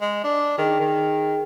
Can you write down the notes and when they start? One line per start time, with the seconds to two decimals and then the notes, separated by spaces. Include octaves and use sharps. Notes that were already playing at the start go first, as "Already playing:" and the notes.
0.01 G#3
0.24 D4
0.58 D#3 G#4 G5
0.80 D#3